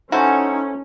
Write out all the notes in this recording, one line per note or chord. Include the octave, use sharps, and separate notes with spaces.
C#4 D#4 E4 F#4 A4 C5